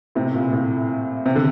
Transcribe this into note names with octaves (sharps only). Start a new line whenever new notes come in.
A2 C3
A#2
A2
C3
D3